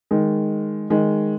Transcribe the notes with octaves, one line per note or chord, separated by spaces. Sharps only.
D#3 G#3
D#3 G#3